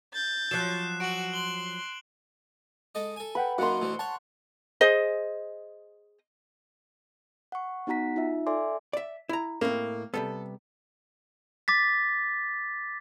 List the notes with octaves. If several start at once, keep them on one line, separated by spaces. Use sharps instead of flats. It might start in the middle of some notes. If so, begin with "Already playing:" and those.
G6 A6
F3 F#3 F#6 C7 E7
F#4 D7 F#7
C6 F#7 G7
G#3 A4 D#5
A4 G#5
B4 F#5 G5 B5
F#2 D#3 A#3 F#4 F#5 C6
D2 B2 E3
C#5 F#5 A5
G#4 C5 D#5
F#5 C#6
B3 D#4 F#4 F#5 A#5 B6
D#4 F4 E5
A4 D5 E5 G#5 C6 D6
D5 E5
E4 A#5
A2 A#3 C4
C3 G3 B3 A4
D6 A6 B6